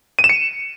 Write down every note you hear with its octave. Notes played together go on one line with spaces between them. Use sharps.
D#7
E7
C#7